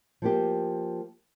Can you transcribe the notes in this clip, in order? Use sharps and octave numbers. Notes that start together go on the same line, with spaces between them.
F3 A#3 G4